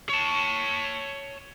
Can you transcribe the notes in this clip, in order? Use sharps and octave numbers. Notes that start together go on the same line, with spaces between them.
C#5 A5